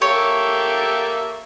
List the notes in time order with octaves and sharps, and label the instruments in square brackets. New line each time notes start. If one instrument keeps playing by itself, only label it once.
[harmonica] A#3 A4 E5 [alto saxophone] G4 [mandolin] C#5